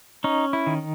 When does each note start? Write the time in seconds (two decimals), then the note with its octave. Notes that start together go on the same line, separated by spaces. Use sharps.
0.24 C#4 D#4
0.53 E4
0.67 D#3